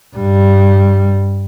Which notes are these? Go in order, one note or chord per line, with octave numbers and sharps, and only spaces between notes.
G2 G3